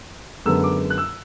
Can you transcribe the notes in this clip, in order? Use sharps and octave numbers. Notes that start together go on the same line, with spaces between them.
F#2 D3 G#3 B3 E6
D6
F#6
E6